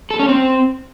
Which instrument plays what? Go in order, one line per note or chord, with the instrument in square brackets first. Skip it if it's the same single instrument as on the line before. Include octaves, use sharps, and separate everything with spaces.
[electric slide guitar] A4
C#4
C4